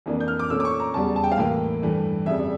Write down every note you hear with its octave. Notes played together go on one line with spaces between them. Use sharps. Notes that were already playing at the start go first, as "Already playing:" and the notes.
F2 E3 A#3 D4
G6
F6
D6
A#2 A3 C#4 E6
D6
C#6
A#5
E2 C#3 G3 A5
A5
G5
F5
A2 E3 A#3 G5
G2 E3 A3
F2 C#3 G3 E5
D5